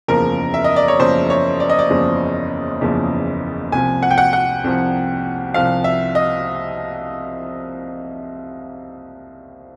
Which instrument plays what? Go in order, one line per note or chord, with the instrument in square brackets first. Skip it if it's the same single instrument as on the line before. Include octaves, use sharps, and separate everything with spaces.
[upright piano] F#1 E2 C#3 F3 A#4
E5
D#5
D5
C#5
F#1 E2 C#3 F3 C5
C#5
D5
D#5
D5
F#1 E2 C#3 F3
F#1 E2 C#3 F3
C2 C3 F3 G#5
F#5
G5
F#5
F#5
C2 C3 F3
C2 C3 F3 F5
E5
D#5